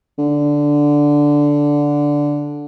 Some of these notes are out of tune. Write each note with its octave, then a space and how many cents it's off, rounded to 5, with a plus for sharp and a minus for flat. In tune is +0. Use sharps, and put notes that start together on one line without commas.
D3 -5